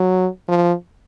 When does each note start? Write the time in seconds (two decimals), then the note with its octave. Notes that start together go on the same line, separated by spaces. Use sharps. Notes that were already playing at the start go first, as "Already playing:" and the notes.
Already playing: F#3
0.48 F3